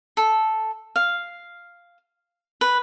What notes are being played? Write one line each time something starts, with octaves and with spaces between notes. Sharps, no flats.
A4
F5
B4